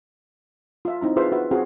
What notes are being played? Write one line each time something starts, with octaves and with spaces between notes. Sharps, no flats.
F4 E5
C4 D#4 E4 A#5
F4 G#4 B4 C5 E5 F5
F#4 B4 C5 E5
C4 F4 F#4 G#4 F5